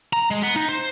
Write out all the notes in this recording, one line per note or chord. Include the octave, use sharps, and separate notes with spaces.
A#5
G#3
B3
D#4
C5